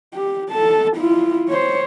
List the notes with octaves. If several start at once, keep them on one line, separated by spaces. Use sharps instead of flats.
G4
A4 A5
E4 F4
C5 C#5